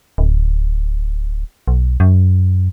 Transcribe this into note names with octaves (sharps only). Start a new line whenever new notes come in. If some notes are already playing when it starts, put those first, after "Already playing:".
D1
B1
F#2